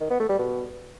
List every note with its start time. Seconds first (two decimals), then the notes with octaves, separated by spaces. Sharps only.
0.01 D#3
0.10 B3
0.20 A3
0.29 G3
0.39 B2